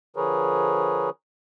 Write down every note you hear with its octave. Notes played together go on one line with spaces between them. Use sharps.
D3 F3 G#4 A#4 B4 C#5